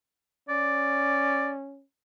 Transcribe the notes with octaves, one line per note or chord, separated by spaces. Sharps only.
C#4 D5